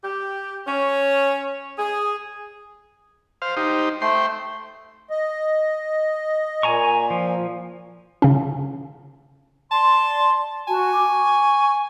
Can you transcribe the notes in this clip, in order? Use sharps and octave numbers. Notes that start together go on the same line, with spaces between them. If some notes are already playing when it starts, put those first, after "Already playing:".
G4
C#4
G#4
C5 F5
D#4 G4 C5
A3 C5 G5 C6
D#5
A#2 G#5 A#5 C#6
F3
C#3 C#4
D5 A5 C6
F#4 G#5 A5
D6
C#6